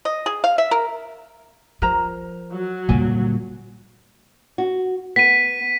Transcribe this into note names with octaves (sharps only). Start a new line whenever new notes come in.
D#5
G#4
F5
E5
A#4
F3 A#4 C5 A#5
F#3
F2 A#2 D3 G3 A#3 G#5
F#4
B3 B6 D#7